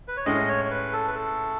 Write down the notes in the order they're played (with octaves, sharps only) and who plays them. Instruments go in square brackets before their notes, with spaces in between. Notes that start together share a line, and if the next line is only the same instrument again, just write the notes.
[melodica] B4
C#5
[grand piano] A2 G#3 C#4 [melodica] D#5
[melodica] C#5
C#5
B4
A4
B4
A4